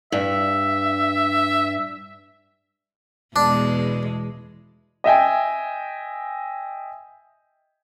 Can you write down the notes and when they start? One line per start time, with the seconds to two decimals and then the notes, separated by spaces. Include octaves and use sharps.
0.12 G2 E5
3.36 E2 B2 G#3 D4
5.04 D#5 E5 G5 G#5